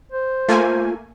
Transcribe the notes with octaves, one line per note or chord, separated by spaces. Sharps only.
C5
A3 A#3 F4 G#5